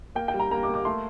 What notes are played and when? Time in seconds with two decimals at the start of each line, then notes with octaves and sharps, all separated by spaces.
0.15 A#3 G5
0.28 G5
0.34 G3
0.39 A#5
0.51 A#3 A#5
0.63 D6
0.68 A#3
0.74 D6
0.85 A3 C6